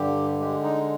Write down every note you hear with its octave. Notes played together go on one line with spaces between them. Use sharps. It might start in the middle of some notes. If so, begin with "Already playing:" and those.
Already playing: G2 D3 G4
G#3 G4
D#4